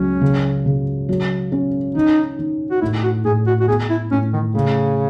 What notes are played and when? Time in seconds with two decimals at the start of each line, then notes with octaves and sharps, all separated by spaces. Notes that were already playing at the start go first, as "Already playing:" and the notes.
Already playing: C#2 F#3 C#4
0.21 C#3
0.66 C#3
1.09 F#3
1.52 C#4
1.95 D#3 D#4
2.39 D#3
2.71 F#4
2.81 A2 E4
3.04 F#4
3.24 A2 G#4
3.47 F#4
3.60 F#4
3.68 B3 G#4
3.90 E4
4.11 A2 C#4
4.33 D#3
4.54 C#3 A3